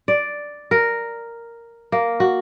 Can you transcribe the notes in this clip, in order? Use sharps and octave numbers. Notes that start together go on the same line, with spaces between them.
D5
A#4
A#3
F#4